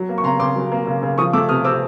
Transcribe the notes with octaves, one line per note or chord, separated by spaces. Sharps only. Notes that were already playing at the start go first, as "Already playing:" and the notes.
Already playing: F#3
A#3
C#6
C#3 A#5 C6
C#3 C6 D6
F#3
A#3
C#3
C#3
F3 C#6 D#6
A3 D6 E6
C3 D#6 F6
C4 D6 E6